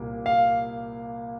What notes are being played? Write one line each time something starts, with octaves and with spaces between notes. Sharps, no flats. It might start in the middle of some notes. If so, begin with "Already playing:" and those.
Already playing: C2 A#2 A#3
F5